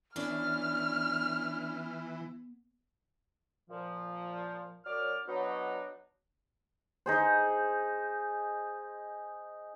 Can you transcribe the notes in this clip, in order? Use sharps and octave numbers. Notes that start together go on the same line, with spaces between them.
E3 B3 C#4 D4 D5 F6
A#2 F3
F#2 F#3 D5 D6 F6
F#3 B3 D4 D#4
D#4 G#4 C5